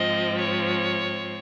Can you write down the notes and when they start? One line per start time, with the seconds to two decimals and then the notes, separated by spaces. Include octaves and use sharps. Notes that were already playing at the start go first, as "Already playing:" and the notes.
Already playing: G#2 F3 C4 D#5
0.38 C#5